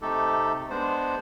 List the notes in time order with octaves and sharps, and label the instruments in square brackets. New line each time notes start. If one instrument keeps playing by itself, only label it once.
[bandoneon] C3 A3 D#4 G4 A4
G#3 B3 D4 C5